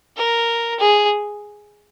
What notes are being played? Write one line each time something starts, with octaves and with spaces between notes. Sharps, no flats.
A#4
G#4